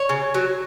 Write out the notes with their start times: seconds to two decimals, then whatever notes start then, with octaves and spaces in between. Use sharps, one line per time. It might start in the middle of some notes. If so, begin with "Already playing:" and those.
Already playing: C#5
0.09 C#3
0.34 F#3